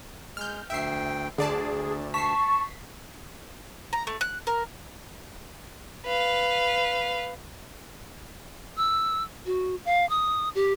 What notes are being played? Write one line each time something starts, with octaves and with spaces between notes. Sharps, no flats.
G#3 F6 G6
D2 E5 G5 C7
D2 D3 G#4 D5 A5
A5 C#6 B6 C7
A#5
A3
F#6
A#4
B4 F5
E6
F#4
F5
D#6
G4